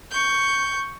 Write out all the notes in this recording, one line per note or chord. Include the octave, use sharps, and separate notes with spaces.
C#6 G6